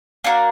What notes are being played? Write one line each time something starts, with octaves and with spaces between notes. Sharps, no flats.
A#3 D4 F#4 A#4